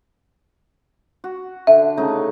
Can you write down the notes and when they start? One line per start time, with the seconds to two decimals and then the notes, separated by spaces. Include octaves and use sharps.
1.24 F#4
1.67 D3 E5
1.98 C#3 A3 D#4